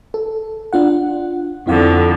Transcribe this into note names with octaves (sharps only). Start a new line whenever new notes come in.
A4
D4 F4 F#5
F2 D3 E4 F5 F#5